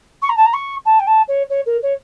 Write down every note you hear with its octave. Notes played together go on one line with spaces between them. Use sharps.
C#6
A#5
A5
A#5
C#6
A5
G5
A5
C#5
C#5
A#4
C#5